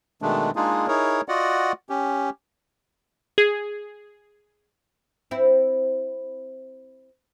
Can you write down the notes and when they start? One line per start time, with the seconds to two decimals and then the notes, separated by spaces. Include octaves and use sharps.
0.22 B2 D#3 G#3 A3 D4
0.56 G#3 A#3 D4 D#4 F4 G#4
0.88 D#4 E4 G#4 A#4 C#5
1.28 F4 F#4 D5 D#5 F#5
1.90 C#4 G4
3.38 G#4
5.31 C4 E4